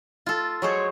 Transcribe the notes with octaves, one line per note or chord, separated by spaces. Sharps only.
F4 A4
F#3 G#3 C5 C#5